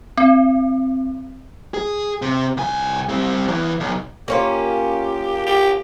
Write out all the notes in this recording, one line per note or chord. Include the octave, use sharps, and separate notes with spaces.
C4
G#4
C3
C2 G#5
G3 C4
E2 E3
B1
A#3 C#4 F4 G4
G4